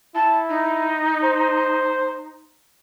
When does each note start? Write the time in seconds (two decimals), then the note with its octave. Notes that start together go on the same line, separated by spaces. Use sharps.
0.15 E4 A5
0.49 D#4
1.24 C5